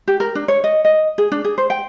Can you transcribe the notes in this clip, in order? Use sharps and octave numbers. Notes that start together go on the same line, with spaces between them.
G4
A#4
D4
C#5
D#5
D#5
G#4
D4
G#4
C5
G5